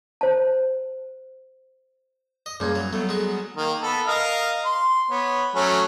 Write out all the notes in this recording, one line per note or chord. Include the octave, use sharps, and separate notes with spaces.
C5 A5
D#5
C#2 F#2 A#2 G3 G#6
F#3
F#3 G3 A3 B3
G#3 F#4
D#3 A#3
B3 A4
A#4 D#5 F5
C6
B3 C#5
F#3 A3 C#4